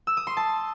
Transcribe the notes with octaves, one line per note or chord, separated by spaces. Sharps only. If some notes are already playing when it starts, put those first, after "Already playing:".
E6
D#6
C6
A5